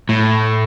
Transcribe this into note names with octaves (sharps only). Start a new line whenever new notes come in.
A2